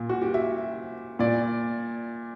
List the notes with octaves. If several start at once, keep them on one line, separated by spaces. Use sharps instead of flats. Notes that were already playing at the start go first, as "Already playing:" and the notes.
Already playing: A#2
F#4
G4
E5
A#2 D5